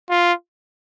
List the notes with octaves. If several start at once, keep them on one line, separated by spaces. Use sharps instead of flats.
F4